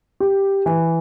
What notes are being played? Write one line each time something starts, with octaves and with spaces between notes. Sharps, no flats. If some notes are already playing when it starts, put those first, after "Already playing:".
G4
E3